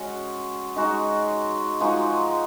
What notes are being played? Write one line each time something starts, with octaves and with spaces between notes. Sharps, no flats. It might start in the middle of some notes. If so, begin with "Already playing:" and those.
Already playing: G#3 C#4 F#4
G#3 D#4 F#4
F3 G#3 D#4 F#4